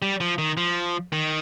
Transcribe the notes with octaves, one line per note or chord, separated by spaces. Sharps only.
G3
F3
D#3
F3
D#3